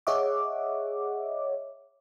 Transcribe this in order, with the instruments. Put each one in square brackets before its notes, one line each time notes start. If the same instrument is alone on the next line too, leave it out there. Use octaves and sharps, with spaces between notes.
[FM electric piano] G#4 C#5 D#5 E5 F#5 D6